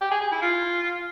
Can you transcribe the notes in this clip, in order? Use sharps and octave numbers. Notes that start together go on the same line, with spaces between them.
G4
G#4
G#4
E4
F4